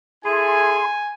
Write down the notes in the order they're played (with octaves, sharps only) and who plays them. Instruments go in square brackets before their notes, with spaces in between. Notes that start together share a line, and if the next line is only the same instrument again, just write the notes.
[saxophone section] E4 G#4 A4 [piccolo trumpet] G#5 [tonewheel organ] C6